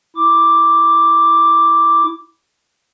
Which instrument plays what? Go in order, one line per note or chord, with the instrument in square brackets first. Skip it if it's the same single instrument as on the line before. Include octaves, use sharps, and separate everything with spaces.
[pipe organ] E4 D6